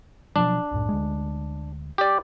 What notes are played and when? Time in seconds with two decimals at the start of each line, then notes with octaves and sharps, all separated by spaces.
0.36 B2 F3 F#3 D4
0.71 C2 F#2 A2
0.89 D2 G#3
1.98 G4 D5